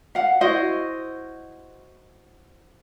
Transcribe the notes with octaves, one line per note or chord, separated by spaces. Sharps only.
F5 F#5
E4 F#4 C5 D#5